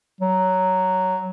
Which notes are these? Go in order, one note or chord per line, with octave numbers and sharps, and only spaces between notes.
F#3